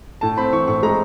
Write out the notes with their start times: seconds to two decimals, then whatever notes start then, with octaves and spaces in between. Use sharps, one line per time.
0.21 A2 A5
0.37 C4 B5
0.53 E3 C#6
0.67 A2 C#6
0.83 G#3 A#5